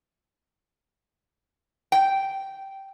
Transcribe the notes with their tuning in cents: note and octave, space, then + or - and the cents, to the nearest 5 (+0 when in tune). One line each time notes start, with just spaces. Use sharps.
G5 -10